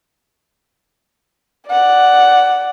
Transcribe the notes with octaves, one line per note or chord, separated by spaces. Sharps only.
D5 F#5